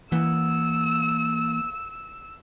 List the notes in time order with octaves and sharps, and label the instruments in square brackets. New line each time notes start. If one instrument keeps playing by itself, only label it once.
[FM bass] E3 [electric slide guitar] A#3 F#5 [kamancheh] E6